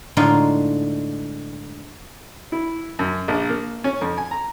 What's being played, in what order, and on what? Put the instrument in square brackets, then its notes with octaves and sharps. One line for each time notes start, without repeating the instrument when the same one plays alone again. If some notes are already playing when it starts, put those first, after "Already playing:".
[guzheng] A2 D3 G#3 D#4 F4
[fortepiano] E4
F#2
A#1
A#3
C#4
F2
G#5
A#5